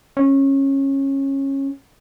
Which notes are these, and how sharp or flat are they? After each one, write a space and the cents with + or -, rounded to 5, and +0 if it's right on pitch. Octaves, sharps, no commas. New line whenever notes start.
C#4 -20